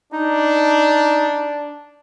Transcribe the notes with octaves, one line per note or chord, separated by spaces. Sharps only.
D4 D#4